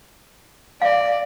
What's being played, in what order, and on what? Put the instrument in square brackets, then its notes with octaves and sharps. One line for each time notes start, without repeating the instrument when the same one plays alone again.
[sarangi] D5 [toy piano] E5 F5